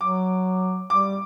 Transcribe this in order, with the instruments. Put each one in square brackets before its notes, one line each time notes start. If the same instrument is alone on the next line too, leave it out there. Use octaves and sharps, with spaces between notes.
[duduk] F#3 [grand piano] D6
[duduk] G3 [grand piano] D6